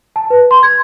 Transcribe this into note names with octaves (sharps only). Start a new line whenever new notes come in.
A5
B4
C6
G#6